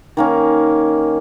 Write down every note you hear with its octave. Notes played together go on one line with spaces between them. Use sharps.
D#3 A#3 C#4